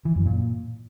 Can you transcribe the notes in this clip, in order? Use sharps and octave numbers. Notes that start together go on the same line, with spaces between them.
E3
F#2
A#2